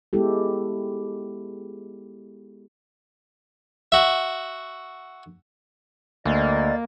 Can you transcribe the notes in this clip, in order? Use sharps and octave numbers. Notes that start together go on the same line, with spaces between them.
G#3 B3 E4 G4 A4
F#4 E5
D2 A#3 D5 D#5 A6